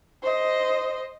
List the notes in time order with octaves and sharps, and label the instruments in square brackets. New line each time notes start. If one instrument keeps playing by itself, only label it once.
[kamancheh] C5 D#5